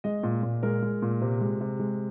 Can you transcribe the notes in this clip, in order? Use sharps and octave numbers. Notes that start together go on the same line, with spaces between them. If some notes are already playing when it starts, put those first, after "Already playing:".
G#3 D#5
A#2
A#2
G#3 A#4
G#3
A#2
C3
G#3
C3
G#3